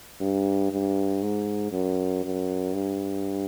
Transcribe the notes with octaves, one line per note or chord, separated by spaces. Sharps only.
G2
G2
G#2
F#2
F#2
G2